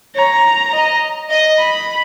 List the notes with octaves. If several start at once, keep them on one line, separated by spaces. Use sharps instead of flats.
C#5 A#5
D#5
D#5
B5